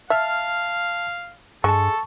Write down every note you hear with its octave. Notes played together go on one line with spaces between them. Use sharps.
E5 F5 A5 F6
G2 G#3 A4 A5 C#6